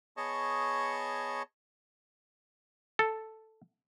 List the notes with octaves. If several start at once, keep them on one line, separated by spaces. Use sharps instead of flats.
B3 G#4 C#5 D#5 A5 C#6
A4